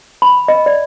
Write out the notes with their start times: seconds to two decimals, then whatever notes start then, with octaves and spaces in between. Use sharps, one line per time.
0.22 B5
0.48 D#5
0.66 D5